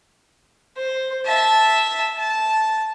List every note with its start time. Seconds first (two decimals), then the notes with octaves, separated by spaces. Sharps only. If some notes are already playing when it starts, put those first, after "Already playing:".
0.76 C5
1.25 E5 A5
2.19 A5